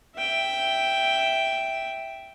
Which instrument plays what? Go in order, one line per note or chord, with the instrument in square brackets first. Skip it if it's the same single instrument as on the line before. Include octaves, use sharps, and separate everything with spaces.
[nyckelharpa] E5 G5